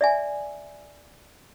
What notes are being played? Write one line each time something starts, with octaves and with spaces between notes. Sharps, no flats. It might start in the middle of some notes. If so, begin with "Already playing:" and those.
D5 E5 G#5